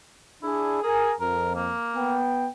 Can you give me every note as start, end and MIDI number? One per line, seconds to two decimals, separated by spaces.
0.43 0.81 62
0.43 0.77 64
0.43 0.81 68
0.82 1.12 68
0.82 1.13 70
0.82 1.13 80
1.20 1.70 41
1.20 1.51 70
1.55 2.16 58
1.96 2.47 59
1.96 2.47 79